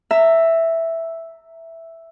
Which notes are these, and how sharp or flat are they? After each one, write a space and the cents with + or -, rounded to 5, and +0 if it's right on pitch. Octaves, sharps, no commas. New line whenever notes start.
E5 +0 A#5 -30